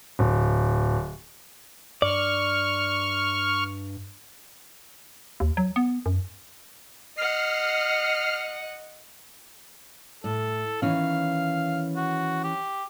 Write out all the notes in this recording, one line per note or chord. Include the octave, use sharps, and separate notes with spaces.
D1
G2 D5 C#6 F6
D#2
F#3
B3
F#2
D#5 F#5 F6 C7
A2 A4
D#3 E3 C#4 F5
F#4
G4